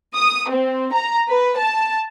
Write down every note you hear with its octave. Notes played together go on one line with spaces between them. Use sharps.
D#6
C4
A#5
B4
A5